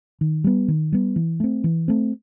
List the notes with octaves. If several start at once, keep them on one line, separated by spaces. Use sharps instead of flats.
D#3
G3 B3
D#3
G3 B3
E3
A3 C4
E3
A3 C4